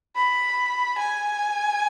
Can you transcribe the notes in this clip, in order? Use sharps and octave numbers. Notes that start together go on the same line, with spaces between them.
B5
G#5